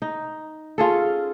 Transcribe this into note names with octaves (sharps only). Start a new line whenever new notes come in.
D#4
C#4 F4 G#4 A4